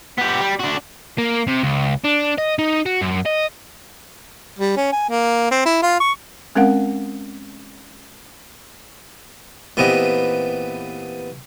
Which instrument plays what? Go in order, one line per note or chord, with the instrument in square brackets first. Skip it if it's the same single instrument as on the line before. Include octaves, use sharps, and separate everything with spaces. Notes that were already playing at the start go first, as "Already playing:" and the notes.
[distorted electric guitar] B3 G4
G3
D4 F#4
[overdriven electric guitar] A#3
C3
C#2
D4
D#5
D#4
F#4
F#2
D#5
[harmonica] G3
C#4
G#5
A#3
C4
E4
F4
C#6
[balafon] G#3 C4 C#4 A#4 F5 F#5
[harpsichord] A#2 E3 B3 C4 G4 D#5